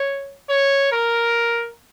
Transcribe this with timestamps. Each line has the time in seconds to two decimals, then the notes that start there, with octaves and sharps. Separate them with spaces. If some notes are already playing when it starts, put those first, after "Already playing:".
Already playing: C#5
0.49 C#5
0.92 A#4